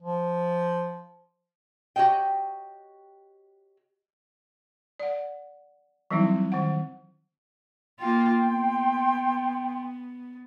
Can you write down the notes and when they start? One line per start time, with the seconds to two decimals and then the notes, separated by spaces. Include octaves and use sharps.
0.02 F3
1.96 F#4 G4 C#5 D#5 G5
5.00 D5 F#5
6.11 E3 F#3 G3 C4 D#4 E4
6.52 D#3 F#5
8.00 A#3 F4 G5 C6
8.43 B3